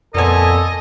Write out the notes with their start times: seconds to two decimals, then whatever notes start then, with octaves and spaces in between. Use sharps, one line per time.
0.15 F2 A#2 B3 A4 D#5 G#5